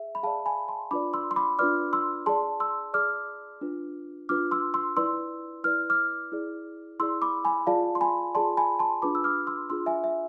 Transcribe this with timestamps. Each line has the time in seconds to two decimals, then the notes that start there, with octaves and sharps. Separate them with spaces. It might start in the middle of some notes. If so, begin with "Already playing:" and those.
Already playing: G#4 E5
0.15 B5
0.23 G#4 D5 F5 A5
0.46 G#5 B5
0.68 A5 C6
0.91 D4 F4 B4 D5 B5 D6
1.13 C6 E6
1.31 C6
1.36 B5 D6
1.59 D4 F4 B4 D5 D6 F6
1.93 C6 E6
2.26 G#4 D5 A5 C6
2.60 C6 E6
2.93 G#4 D5 D6 F6
3.61 D4 F4 B4
4.29 D4 F4 B4 D6 F6
4.51 C6 E6
4.74 C6 E6
4.97 E4 B4 D5 C6 E6
5.64 E4 B4 D5 F6
5.90 D6 F6
6.32 E4 G#4 D5
7.00 E4 G#4 D5 C6 E6
7.22 B5 D6
7.45 G#5 B5
7.67 F4 G#4 D5 F5 A5
7.95 C6
8.01 G#5 B5
8.35 F4 G#4 D5 A5 C6
8.57 G#5 B5
8.79 A5 C6
9.02 D4 F4 G#4 B4 B5 D6
9.15 E6
9.24 D6 F6
9.47 C6 E6
9.70 D4 F4 G#4 B4 C6 E6
9.86 E5 G#5
10.04 E5